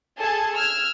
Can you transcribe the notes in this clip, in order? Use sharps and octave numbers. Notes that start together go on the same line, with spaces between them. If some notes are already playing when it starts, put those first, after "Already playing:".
G#4 A4 G#5 A5 G#6
E6 F6 G#6